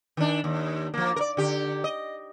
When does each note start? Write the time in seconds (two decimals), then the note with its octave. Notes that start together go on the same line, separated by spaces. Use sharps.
0.17 D#3 D4
0.44 D#2
0.94 F3 A#3
1.16 A#4 D5
1.37 D3 G4
1.84 D#5